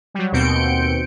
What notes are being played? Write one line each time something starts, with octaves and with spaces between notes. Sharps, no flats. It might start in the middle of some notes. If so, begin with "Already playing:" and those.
F#3 G3
D#2 B2 C4 G6 C#7 D7